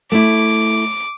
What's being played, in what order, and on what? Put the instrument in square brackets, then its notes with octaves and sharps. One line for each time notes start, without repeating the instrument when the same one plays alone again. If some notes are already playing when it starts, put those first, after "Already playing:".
[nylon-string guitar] A3 E4 [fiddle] D6